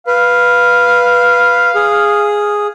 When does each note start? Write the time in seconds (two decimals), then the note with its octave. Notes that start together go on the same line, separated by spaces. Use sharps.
0.07 B4 F5
1.75 G#4